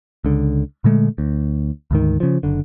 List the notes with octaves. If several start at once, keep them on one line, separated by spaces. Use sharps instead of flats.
C#2 D3
A#2 D3 G#3 A3
D2
D2 G#2 D#3
C#3 F3
F#1 D3